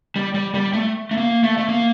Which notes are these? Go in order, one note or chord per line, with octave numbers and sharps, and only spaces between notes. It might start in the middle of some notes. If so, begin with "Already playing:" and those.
G3
G3
G3
A3
A3
A#3
A3
A3
A#3